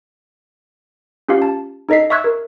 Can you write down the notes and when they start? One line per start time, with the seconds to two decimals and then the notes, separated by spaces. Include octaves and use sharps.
1.28 C#4 F4 G4 F5
1.42 A5
1.89 D#4 A4 D#5 B6 C7
2.10 E5 C6 C#6 E6 F#6 G#6
2.24 A#4